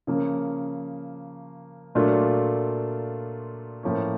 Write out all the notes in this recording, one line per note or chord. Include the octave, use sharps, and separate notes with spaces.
C#3 F3 A#3 C#4
A#2 F#3 A3 D4 F4
A2 F3 A#3 C#4